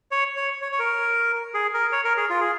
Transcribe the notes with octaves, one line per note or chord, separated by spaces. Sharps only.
C#5
C#5
C#5
C#5
A#4
G#4
A#4
C#5
A#4
G#4
F4
G#4